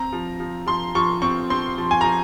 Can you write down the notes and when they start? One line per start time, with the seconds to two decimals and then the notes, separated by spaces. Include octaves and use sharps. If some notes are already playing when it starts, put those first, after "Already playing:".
Already playing: C4 A#5
0.13 F3
0.40 F3
0.67 F3 C6
0.95 F3 C#6
1.22 C4 C#6
1.50 C4 C6
1.78 F3
1.91 G#5
2.01 F3 A#5